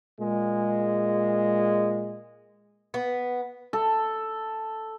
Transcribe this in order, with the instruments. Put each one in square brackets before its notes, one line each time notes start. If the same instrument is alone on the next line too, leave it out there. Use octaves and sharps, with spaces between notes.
[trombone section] A#2 G#3
[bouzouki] B3
[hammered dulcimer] A4